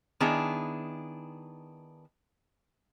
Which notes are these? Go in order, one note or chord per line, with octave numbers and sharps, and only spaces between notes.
D#3 B3 D4 E4 G#4